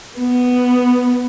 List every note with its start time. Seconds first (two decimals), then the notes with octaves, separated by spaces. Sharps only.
0.19 B3